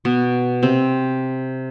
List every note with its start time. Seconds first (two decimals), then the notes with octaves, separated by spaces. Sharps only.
0.05 B2 B3
0.63 C3 C4